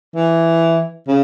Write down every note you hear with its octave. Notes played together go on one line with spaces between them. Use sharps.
E3
C#3